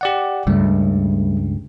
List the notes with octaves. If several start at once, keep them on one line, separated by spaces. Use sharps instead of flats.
G4 D5 F#5
C#2 G2 G3 A3